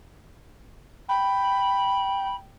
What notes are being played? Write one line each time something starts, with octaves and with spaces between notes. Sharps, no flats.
G5 B5